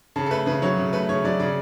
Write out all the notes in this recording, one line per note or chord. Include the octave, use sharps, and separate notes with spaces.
C#3 A5
A4
A3 B4
C#3 B4
F#3 C#5
C#3
A3 B4
C#3 C#5
F#3 D5
C#3 D5